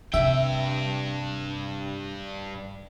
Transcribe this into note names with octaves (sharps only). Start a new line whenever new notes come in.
G2 C3 E5 G5